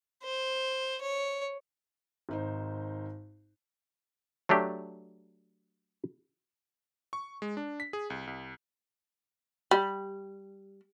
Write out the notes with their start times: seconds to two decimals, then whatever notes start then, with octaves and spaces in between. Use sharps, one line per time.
0.24 C5
1.02 C#5
2.29 G#1 D#4 C5
4.49 F#3 A3 D4 G4
7.13 C#6
7.42 G#3
7.57 D4
7.80 B6
7.93 G#4
8.10 C2
8.27 C2
9.71 G3